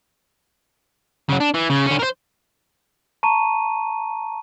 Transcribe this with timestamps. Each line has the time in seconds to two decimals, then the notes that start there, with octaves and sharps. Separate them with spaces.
1.29 C#3 F#3
1.41 D4
1.55 E3
1.70 C#3
1.86 D3 C#4
1.99 A#4 C5
3.23 A5 A#5 C#6 D#7